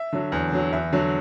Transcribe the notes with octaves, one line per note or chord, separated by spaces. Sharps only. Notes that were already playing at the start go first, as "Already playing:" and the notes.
Already playing: E5
D3 F#3
E2
D3 F#3
E2 E5
D3 F#3